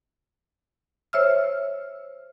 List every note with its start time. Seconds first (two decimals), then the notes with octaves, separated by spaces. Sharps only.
1.13 C5 C#5 E5 E6 F6